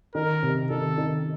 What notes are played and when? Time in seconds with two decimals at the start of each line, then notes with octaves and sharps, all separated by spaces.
0.15 D#3 A#4
0.43 C3
0.70 D#3 A4
0.98 D#3